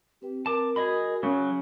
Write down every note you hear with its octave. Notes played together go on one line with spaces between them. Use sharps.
C4 G4 B4 G5
A#4 A5 D6
F#4 G#4 D#5 B5
C#3 F#3